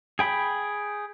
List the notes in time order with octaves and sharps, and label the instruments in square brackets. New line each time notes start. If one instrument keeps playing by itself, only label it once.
[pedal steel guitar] G#4 G5 B5